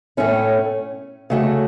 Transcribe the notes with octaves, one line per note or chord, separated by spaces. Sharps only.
A2 A3 C#4 E4
C#3 A3 F#4